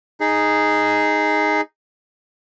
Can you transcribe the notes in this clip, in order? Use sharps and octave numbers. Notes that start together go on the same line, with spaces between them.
D#4 G#4